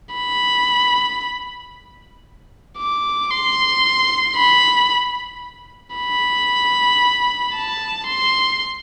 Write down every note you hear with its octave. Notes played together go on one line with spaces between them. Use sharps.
B5
D6
C6
B5
B5
A5
C6